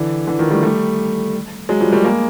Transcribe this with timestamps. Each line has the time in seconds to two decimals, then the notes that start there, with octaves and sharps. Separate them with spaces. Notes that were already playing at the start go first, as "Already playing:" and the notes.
Already playing: D3 E3
0.27 D3 E3
0.39 D#3 F3
0.51 G3 A3
0.62 G3 A3
1.69 F#3 G#3
1.81 F3 G3
1.92 G3 A3
2.04 G#3 A#3